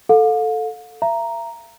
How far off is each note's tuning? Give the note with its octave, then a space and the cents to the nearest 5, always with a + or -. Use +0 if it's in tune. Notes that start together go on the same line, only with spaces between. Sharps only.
A4 +0 F5 +40
E5 +40 A#5 +0